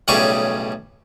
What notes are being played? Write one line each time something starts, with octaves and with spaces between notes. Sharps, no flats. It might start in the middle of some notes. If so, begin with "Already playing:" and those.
B1 A2 C#3 G3 G#4 C#6